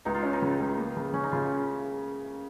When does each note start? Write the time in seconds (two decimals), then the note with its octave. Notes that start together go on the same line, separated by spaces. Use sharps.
0.05 C#2 D#4
0.14 F4
0.23 C#4
0.33 D#4
0.42 C#3
0.60 C#2
0.78 A#3
0.97 C#3
1.13 C#3 C#4
1.24 D#4
1.32 C#3 F4